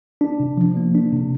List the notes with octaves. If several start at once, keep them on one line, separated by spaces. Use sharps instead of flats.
D4
C3
F3
A#3
D4
C3